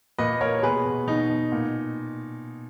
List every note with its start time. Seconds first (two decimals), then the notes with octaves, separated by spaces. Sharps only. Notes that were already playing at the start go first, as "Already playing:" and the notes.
0.19 A#2 B4 D#5
0.41 A#2 A#4 C#5
0.59 C#5
0.63 B2 G#4 B4
0.85 B2
1.07 B2 D#4
1.30 B2
1.52 A#2